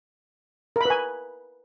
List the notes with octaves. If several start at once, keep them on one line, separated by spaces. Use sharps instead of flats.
A#4 B4 G#5 B5